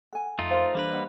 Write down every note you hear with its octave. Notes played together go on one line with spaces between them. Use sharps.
A4 F#5 G#5
F2 A3 D#4 F4
A#4 C5 F5 C6
E3 G3 A#3 D4 A4 B4 A#5
D#5 F#5